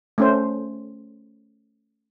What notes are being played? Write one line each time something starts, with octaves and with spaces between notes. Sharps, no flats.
A3 C#4 C5